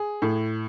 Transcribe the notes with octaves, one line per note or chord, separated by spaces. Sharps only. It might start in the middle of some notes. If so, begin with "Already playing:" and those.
Already playing: G#4
A2